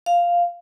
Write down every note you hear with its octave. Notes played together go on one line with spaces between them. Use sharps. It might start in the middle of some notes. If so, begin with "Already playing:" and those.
F5